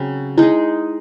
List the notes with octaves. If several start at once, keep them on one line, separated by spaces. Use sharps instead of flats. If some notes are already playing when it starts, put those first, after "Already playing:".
Already playing: C#3 F#3 C4
G#3 D#4 E4 G#4